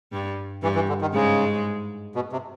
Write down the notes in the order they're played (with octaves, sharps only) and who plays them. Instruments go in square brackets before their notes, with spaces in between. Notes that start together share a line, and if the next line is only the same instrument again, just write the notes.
[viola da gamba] G2 G3
[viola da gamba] G2 G3 [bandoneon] E3
[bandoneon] E3
D3
D#3
[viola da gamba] G#2 G#3 [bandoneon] C#3
[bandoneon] B2
C3